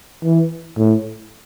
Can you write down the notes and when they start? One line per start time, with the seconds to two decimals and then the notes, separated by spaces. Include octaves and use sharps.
0.24 E3
0.78 A2